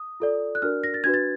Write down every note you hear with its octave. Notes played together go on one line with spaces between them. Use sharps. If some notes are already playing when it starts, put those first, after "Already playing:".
Already playing: D#6
F4 A4 D5
F#6
D4 F#4 A#4 D5 F6
A#6
A6
D4 F#4 B4 G#6
A6